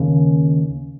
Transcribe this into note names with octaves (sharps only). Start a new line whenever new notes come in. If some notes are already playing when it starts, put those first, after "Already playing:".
Already playing: D#2 C#3